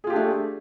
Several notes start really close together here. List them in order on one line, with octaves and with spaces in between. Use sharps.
G#4 F4 G4 D4 A3